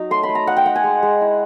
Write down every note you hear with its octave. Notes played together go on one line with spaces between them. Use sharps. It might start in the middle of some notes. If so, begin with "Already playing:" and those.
Already playing: F#3 D#4
A3 C6
B5
A3
A#5
D#4 F#5
G5
D#4 F#5
G#5
G#3
G#3
E4